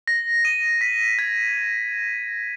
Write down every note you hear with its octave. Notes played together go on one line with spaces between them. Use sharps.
A#6
D#7
B6
G#6